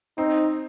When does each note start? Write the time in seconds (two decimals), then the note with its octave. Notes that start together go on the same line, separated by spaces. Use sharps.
0.18 C4 D#4